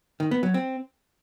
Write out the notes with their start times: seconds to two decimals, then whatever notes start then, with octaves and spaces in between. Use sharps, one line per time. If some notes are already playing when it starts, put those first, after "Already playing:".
0.20 D#3
0.31 B3
0.43 F#3
0.54 C4